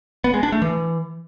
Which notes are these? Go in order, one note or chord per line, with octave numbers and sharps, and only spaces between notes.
B3
G#3
D4
A3
E3